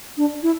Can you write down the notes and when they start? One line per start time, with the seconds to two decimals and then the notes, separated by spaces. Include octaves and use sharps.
0.17 D4
0.43 E4